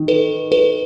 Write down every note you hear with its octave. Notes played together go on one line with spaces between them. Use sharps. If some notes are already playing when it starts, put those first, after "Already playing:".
Already playing: D#3
A4 B4
A4 B4